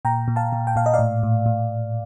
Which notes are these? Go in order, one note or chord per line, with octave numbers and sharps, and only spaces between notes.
A#2 G5 A#5
A#2
F5 A5
A#2
G5
A#2 F5
D#5
A2 D5 F5
A2
A2